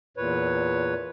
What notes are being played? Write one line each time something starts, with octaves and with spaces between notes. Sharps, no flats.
E2 A#2 B4 C#5